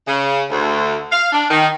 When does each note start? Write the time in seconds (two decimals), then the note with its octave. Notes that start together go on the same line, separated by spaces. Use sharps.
0.07 C#3
0.50 D2
1.12 F5
1.32 D4
1.50 D#3